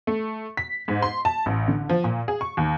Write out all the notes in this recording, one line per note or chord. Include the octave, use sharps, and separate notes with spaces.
A3
B6
G#2
C6
A5
A1
D3
F3
A#2
G#4
C#6
D#2